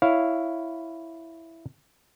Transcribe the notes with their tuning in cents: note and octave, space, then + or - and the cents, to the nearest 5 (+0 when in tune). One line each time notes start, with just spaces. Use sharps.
E4 +0 C#5 +0 F5 +0